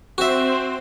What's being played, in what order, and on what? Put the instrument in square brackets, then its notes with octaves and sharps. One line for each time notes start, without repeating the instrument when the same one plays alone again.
[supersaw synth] C4 C5 [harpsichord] F#4 E5